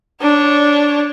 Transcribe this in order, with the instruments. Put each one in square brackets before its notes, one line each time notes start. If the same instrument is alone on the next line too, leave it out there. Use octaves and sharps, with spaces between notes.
[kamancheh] D4 C#5